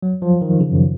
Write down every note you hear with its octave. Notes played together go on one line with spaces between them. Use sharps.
F#3
F3
D#3
C#3
F#2